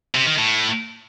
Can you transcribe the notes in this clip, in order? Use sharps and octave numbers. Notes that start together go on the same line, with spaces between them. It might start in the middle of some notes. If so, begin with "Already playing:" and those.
C3
D#3
A2